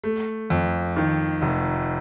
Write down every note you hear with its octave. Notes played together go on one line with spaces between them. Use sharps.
A3
F2
D#3
F1